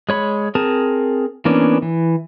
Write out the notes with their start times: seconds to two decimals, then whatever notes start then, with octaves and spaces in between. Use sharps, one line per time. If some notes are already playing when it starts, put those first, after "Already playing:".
0.09 G#3 C#5 B5
0.55 C4 G#4 A#4 A5
1.45 E3 A#3 B3 C#4 D4
1.82 E3